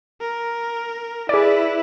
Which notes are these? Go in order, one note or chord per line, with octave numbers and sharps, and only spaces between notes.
A#4
E4 G#4 B4 D5